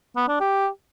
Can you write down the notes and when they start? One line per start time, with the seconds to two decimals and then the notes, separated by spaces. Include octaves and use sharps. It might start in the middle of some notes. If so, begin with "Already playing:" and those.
0.16 B3
0.28 D4
0.40 G4